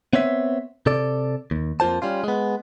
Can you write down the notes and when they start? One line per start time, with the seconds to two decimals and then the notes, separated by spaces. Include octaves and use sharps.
0.13 B3 C4 C#5 E5
0.86 C3 A4 D5
1.51 D#2
1.80 F2 A#3 F4 C5 A5
2.02 G3 C#4 F4
2.24 G#3 B3